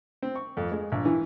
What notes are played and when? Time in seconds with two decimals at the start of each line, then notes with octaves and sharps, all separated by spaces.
0.22 C4
0.35 C#6
0.57 F2
0.72 G#3
0.92 A#1
1.05 E3